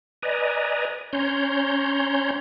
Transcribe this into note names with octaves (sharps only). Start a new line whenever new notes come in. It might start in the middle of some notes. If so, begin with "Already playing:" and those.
B4 D5 D#5 G#5 A#5
C#4 C#5 A#5 C6 G6